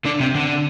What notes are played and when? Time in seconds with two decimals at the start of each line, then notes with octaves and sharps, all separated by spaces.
0.05 D3 D4
0.20 C3 C4
0.35 D3 D4